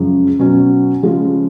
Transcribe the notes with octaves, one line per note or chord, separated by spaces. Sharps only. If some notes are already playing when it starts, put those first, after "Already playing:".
Already playing: F#2 C#3 F3 G#3
B2 F#3 C#4
C#3 F3 G#3 C#4